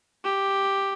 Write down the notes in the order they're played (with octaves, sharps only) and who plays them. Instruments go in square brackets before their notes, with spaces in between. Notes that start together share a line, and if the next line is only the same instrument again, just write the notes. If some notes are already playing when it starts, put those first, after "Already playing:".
[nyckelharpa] G4